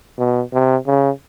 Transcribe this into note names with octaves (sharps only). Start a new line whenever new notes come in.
B2
C3
C#3